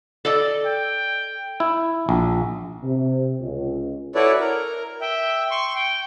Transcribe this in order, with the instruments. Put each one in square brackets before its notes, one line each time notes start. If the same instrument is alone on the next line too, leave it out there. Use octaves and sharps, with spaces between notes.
[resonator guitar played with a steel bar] A4 D5 D#5
[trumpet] G5
[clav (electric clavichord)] E4
A#1
[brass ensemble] C3
C#2
[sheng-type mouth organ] E4 F#4 A4 B4 C#5 D5
A#4
E5 G5
C6 C#6
G5